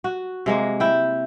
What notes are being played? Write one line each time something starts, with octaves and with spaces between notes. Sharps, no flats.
F#4
C3 G#3 A#3
E4 G5